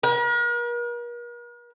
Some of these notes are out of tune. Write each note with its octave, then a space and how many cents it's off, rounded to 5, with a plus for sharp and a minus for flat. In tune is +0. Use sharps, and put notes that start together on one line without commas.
A#4 +45